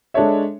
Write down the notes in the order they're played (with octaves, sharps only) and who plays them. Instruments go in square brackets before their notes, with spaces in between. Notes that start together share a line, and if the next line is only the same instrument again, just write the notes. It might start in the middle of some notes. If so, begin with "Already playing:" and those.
[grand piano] G#3 D4 A4 C#5 E5